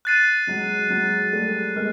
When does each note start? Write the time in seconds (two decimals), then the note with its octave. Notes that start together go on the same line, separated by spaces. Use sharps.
0.05 F#6 A6 C7 D#7
0.47 F#3 G#3
0.90 F#3 G#3
1.33 G3 A3
1.76 G#3 A#3 F6